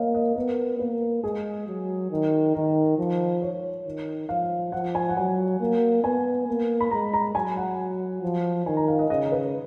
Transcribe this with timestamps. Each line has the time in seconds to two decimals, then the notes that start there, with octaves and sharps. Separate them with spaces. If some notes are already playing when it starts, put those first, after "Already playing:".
Already playing: A#3 C#5 D#5 F5
0.14 D#5
0.36 B3 A#4
0.79 A#3 B4
1.23 G#3 G#4
1.67 F#3
2.11 D#3
2.55 D#3 A#4
2.98 F3
3.42 C#5
3.86 D#3
4.29 F3 F5
4.72 F3 F#5
4.95 G#5
5.09 F#5
5.17 F#3 G#5
5.60 A#3
6.03 B3 G#5
6.48 A#3
6.80 B5
6.91 G#3 A#5
7.13 A#5
7.35 F#3 G#5
7.57 F#5
8.22 F3
8.66 D#3 G#5
8.77 A#5
8.88 F5
8.99 D#5
9.10 C#3 D#5
9.32 B4